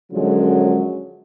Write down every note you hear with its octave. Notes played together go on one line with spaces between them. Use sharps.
F#2 D3 F3 F#3 G#3